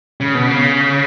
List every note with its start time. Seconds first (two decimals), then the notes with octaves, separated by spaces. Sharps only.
0.21 C#3
0.35 B2
0.48 C#3